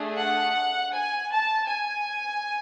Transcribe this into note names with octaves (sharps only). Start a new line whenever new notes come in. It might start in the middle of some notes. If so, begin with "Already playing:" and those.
Already playing: A3 D4 G#4
F#5
G#5
A5
G#5